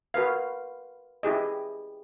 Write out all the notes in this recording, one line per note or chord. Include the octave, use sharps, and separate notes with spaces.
F#4 A#4 B4 F5
E4 G4 G#4 D#5